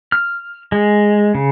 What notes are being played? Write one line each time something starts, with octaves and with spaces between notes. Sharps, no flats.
F6
G#3
C#3